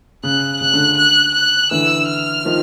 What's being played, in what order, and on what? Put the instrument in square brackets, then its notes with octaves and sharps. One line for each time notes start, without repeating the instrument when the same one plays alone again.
[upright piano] C#3 [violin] F#6
[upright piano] C#3 [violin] F#6
[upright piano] D3
[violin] F#6
F#6
[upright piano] D3 E3 [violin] E6
[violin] F6
[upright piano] D#3 F3